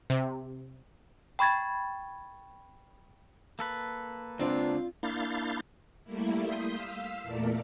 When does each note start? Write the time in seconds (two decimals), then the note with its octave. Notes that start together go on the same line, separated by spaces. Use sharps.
0.10 C3
1.39 G5 B5 C#6 G#6 A6
3.59 A#3 A4 B4
4.39 C#2 C4 D4 F4 D5
5.03 A#3 D4 E4 F5 G6 A6
6.04 G3 A3 A#3 E4
6.39 C6 D#6 G6 B6
6.70 F5 E6 B6
7.22 E2 A#2 A3 A4 A#4 D5